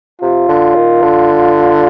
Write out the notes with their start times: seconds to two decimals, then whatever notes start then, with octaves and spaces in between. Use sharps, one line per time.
0.22 C3 F4
0.48 D3
0.75 D#3
1.02 D3